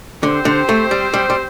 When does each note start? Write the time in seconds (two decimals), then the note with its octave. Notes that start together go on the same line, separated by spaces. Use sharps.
0.23 D3 C4 G4 C5
0.45 D3
0.69 A3
0.91 G3
1.14 G3
1.30 G3